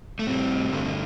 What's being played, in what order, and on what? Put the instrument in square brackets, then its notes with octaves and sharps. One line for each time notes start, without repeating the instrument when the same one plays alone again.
[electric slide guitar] A3
A2 G3 C4
G2 D3 A3